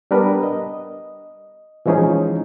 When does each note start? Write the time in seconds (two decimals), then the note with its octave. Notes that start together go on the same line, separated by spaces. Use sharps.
0.11 G3 B3 D4 A#4 B4
0.43 D#5
1.86 E3 F3 G#3 C#4 D#4 G#4